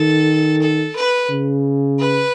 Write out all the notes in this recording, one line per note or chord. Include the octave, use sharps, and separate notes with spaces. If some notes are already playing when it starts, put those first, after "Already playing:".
Already playing: D#3 A4
A4
B4
C#3
B4